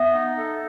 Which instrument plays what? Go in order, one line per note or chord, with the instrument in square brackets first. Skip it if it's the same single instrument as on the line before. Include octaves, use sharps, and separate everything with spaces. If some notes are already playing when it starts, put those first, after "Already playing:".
Already playing: [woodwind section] B3 [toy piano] E5
[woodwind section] D#4
A4